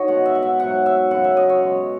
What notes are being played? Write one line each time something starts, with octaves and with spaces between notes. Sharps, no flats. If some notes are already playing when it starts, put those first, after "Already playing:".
Already playing: D#3 F#4 C#5 D#5
B2 G#3 F#5
E5
F#5
E5
G#2 F#3 F#5
E5
F#2 C#3 F#3 F#5
E5
D#5
C#5
B2 G#3